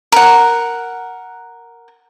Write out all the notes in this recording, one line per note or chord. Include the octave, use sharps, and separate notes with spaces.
A#4 F#5